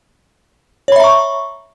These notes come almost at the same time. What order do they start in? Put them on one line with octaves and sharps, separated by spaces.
C#5 B5 E5 A#5 C#6